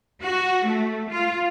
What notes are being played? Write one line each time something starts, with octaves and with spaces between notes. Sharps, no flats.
F#4
A3
F4